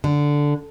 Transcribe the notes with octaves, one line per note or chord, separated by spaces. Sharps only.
D3